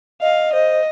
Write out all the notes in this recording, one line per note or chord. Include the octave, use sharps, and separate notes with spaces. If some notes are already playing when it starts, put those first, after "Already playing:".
D#5 F5
C5 D#5